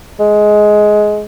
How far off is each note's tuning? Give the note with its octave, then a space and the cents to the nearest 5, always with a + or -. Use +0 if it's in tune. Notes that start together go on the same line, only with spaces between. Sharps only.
G#3 +15